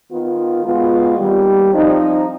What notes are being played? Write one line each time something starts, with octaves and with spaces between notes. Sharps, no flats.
D#3 B3 F4
B2 G#3 B3 F4
D#2 D#3 G3
F3 C4 D#4